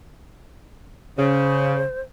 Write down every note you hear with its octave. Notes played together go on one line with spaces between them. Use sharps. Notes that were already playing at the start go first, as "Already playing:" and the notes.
C#3 C5